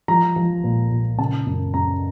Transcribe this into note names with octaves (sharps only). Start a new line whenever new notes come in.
F3 A#5
F3
A#2
A#2
C#3 A5
F#2
F#2 A#5